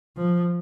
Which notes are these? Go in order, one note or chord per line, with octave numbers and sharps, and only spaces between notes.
F3